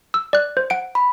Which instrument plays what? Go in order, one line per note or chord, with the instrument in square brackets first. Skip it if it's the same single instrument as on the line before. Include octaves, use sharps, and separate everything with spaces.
[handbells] E6
D5 F#6
C5
F#5 D7
[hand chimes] B5